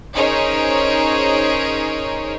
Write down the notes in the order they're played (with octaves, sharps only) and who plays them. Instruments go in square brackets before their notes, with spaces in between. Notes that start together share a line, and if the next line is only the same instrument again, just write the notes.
[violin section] C#4 D#4 G#4 A#4 C5 C#5